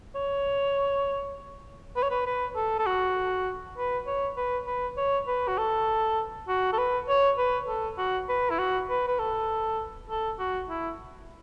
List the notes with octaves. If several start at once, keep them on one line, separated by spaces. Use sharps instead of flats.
C#5
B4
C#5
B4
B4
A4
A4
F#4
B4
C#5
B4
B4
C#5
B4
F#4
A4
F#4
A4
B4
C#5
B4
A4
F#4
B4
E4
F#4
B4
B4
A4
A4
F#4
E4